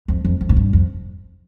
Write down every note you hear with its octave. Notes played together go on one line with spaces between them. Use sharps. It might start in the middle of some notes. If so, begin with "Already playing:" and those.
F2
F2
F2
A2
G2
F2